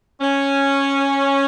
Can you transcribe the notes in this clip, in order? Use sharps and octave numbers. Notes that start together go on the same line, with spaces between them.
C#4